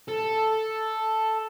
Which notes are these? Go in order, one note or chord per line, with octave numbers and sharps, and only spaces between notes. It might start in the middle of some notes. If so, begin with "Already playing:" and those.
A4